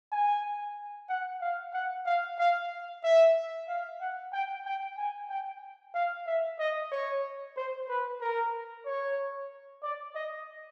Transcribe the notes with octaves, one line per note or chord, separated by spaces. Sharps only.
G#5
F#5
F5
F#5
F5
F5
E5
F5
F#5
G5
G5
G#5
G5
F5
E5
D#5
C#5
C5
B4
A#4
C#5
D5
D#5